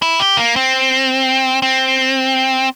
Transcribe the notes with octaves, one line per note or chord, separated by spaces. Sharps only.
E4
G4
A#3
C4
C4